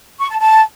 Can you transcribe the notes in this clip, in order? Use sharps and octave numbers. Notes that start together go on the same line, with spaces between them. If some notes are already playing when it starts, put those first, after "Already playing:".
C#6
A5
A5